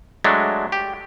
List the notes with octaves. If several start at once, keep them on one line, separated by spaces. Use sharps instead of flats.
F#3 G#3 A3 D4
G4